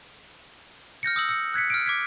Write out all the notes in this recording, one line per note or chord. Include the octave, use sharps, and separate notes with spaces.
F6 G6 A#6 C#7
D#6 E6 F#7
E6 C#7
F#6 G#6 B6 C#7
F6 D7
D6 G#6 B6